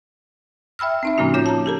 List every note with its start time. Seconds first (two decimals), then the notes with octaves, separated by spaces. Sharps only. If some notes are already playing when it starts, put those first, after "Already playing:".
0.79 E5 G5 B5 E6 F6
1.03 C4 D#4 E5
1.18 A2 C#3 F3 A#3 C#4 F#4
1.34 F4 C#5 G6
1.46 A5 A#5
1.66 G4 A4 A#4